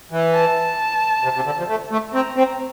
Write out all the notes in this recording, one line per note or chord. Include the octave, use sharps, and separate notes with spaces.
E3
A5
C3
C3
D3
F3
A3
A3
C4 A#5
C4